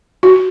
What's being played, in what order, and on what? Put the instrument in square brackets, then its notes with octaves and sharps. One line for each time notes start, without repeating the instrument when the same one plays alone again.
[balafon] F#4